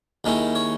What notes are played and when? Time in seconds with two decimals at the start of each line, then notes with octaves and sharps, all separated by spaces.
0.24 D#2 D#3 G#3 C#4 E4
0.55 C#5